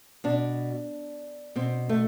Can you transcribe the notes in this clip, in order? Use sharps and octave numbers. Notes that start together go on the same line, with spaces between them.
B2 D4
B2 C4
A3